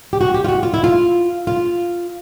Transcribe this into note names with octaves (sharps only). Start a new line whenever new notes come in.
G4
F#4
G4
F4
F#4
F4
E4
F4
F4